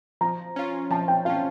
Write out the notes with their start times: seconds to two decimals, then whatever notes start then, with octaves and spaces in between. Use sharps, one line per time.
0.21 F3 A#5
0.56 C#4 F4
0.90 F3 A5
1.08 G5
1.25 C#4 F4 F5